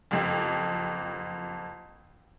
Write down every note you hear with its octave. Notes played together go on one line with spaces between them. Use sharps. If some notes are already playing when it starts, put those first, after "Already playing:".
F#1 F2 G4